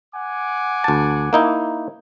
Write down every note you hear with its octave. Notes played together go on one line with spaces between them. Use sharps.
F#5 G#5 D6
D2 A5
A#3 D#4 E4